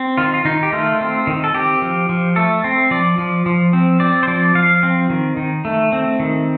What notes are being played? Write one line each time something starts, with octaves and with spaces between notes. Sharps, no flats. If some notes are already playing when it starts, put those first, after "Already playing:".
Already playing: C4
D#3 F4
F4
D#3 D#4
G4
A3 F4
C4
D#3
A4
C4 G4
F3
F3
A3 A4
C4
F3 D5
F3
F3
C4
C4 D5
C5
F3 D5
F3 F5
C4
D#3
D#3
A3
C4
D#3